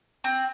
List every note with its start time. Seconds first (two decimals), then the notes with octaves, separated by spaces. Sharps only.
0.24 C4